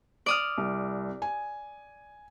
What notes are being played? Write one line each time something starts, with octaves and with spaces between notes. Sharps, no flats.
D5 D#6 F6
C2
G#5